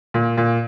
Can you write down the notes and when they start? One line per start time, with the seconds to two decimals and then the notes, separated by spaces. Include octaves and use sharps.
0.14 A#2
0.37 A#2